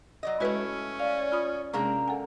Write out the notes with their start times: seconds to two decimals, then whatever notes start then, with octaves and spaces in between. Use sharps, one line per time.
0.23 F#3 D5 D#5
0.40 G#3 A3 C#4 E4 F#4 B4
1.00 D5 F5
1.32 F4 B5 D#6
1.73 C3 G#3 A#3 C#4 D4 G#4 A#5
2.08 A4 F#5 G#5